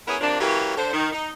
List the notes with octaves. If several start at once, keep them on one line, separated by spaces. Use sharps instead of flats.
B3 C#4 E4 G#4 A#4 C#5
C3 F3 A#3 D4
E3 F#3 A#3 C#4 G4
D3 C5
D#3
D#4